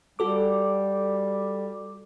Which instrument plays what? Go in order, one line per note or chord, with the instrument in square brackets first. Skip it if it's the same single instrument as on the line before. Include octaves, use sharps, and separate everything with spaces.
[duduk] G3 [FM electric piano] F#4 A4 D6